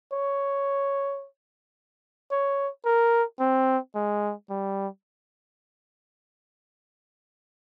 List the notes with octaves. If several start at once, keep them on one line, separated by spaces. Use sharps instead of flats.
C#5
C#5
A#4
C4
G#3
G3